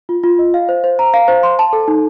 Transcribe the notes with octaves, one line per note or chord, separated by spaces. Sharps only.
F4
F4
D#5
F5
C5
C5
A#5
F5
C5
C6
A5
A4
D#4